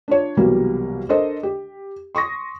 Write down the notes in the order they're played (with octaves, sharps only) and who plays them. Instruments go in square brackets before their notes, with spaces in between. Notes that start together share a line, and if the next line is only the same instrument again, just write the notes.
[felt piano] D4 F4 C#5
C2 B2 E3 F#3 G3 A#3
D4 A4 A#4 C5 D#5
G4
C6 C#6 D#6 A#6